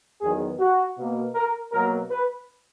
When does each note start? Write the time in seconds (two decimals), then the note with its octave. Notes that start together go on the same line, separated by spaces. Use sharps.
0.21 E2 D#3 F#3 B3 G#4
0.60 F#4
0.97 B2 A#3
1.35 A#4
1.72 B2 F#3 A#3 A#4
2.10 B4